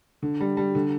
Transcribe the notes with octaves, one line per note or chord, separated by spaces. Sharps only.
D3
G3
G3
D3